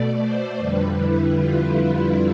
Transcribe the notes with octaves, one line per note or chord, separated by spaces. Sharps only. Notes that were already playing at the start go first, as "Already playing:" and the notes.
Already playing: B2 A3 D5
C5
F2 D3 G3 B4
E4
F4